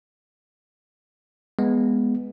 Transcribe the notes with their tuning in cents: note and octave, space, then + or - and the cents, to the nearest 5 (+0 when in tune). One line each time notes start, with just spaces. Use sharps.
G#3 +0 B3 -5